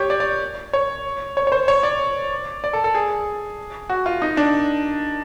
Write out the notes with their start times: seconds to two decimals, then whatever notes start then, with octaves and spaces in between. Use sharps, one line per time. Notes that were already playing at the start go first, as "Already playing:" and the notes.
Already playing: G4 C#5
0.10 D5
0.20 D5
0.73 C#5
1.37 C#5
1.47 C#5
1.52 C5
1.68 C#5
1.83 D5
2.64 D5
2.73 A4
2.84 A4
2.95 G#4
3.90 F#4
4.06 F4
4.22 D#4
4.37 D4